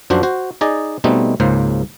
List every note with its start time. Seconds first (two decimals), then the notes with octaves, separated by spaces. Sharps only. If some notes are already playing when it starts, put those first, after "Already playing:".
0.10 F#2 F3 D4 F#4 C5
0.23 F#4 C5
0.61 D#4 G#4 D5 D#5
1.04 B2 G3 A3 C4 D#4
1.40 C#2 G#2 C#3 A#3 C5